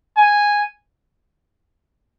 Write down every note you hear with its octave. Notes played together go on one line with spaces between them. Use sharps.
G#5